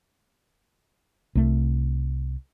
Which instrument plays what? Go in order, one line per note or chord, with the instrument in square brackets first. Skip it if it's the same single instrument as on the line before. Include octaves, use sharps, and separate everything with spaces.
[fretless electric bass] C2 A3